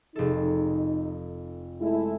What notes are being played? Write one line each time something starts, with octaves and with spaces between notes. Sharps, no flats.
F1 D#4 A4
G#3 A3 E4